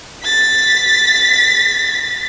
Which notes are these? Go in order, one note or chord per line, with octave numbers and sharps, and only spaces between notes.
A6 B6